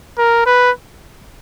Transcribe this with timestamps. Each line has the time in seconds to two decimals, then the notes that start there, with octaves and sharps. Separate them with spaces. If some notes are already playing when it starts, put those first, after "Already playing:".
0.18 A#4
0.46 B4